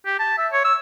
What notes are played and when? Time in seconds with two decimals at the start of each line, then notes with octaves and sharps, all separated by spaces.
0.06 G4
0.19 A5
0.38 E5
0.53 C#5
0.64 E6